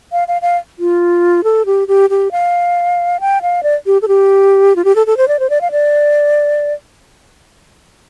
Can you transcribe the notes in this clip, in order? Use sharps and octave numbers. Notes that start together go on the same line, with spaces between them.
F5
F5
F5
F4
A4
G4
G4
G4
F5
G5
F5
D5
G4
A4
G4
F4
G4
A4
A4
C5
D5
C5
D5
F5
D5